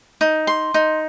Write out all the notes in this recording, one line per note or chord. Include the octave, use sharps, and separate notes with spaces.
D#4
C6
D#4